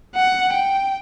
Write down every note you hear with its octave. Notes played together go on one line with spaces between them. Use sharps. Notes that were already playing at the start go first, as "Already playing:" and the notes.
F#5
G5